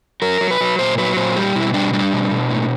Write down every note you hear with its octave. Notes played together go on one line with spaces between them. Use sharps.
F#3 A#4
F#3
B4
F#3
A#2 C5
F#3 B4
A#2 C5
G3 G4
B2 E4
G3 D4
G3 D4
B2
B2
A2